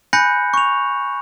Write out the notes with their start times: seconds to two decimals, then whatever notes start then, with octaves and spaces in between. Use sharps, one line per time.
0.13 G#5 B5 F#6 G6 A#6 C#7
0.54 C#6 F7